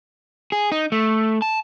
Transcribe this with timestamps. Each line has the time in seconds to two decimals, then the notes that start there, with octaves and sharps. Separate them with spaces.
0.52 G#4
0.72 D#4
0.92 A3
1.42 A5